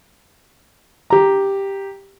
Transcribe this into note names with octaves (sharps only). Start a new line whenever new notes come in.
G4 A#5